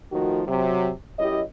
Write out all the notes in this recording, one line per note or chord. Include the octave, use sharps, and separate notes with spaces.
D#3 F3 A3 D#4 F#4
C3 F#3
F#2 E4 G4 C#5 D#5